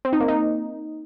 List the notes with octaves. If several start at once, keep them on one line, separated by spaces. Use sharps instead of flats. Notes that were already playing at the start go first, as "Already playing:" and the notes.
C4
D#4
A#3
D#4